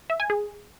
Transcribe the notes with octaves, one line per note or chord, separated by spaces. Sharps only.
E5
G#5
G#4